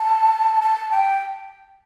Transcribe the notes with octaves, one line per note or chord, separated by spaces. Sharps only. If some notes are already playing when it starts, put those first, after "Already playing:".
Already playing: A5
A5
G5